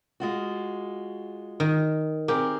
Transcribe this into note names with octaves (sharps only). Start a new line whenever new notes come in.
G#3 F4 F#4
D#3
C4 G4 G#4 A#4